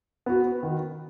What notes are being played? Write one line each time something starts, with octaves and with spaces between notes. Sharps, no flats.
B3 F#4
D#3